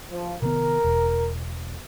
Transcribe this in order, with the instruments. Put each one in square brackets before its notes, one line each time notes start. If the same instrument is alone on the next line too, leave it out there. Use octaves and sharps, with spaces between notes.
[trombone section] F3
[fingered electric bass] C3 D#3 B3 [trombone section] A#4
[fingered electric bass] E1